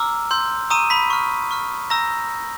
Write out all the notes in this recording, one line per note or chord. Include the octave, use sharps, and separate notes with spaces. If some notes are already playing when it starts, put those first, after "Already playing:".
Already playing: A#5 D6 E6 F6
C6 E6 G6
A#5 C#6 D#6 E6 D#7
B5 B6
C#6 F6
C#6 F6
A#5 C#6 E6 G6 A#6